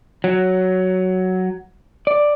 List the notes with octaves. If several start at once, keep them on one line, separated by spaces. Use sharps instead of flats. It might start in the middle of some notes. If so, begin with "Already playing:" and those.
F#3
D5